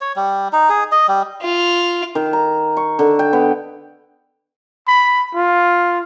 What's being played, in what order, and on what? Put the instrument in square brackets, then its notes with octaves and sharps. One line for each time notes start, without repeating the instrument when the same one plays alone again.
[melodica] C#5
G3
D#4
G#4
D#5
G3
[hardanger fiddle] F4
[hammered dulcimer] D#3
A#5
C#6
D3
G5
B3
[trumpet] B5
F4